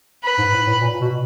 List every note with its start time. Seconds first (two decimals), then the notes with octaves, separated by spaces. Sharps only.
0.24 B4
0.38 G#2
0.52 A2
0.67 A2
0.81 A#2
1.01 B2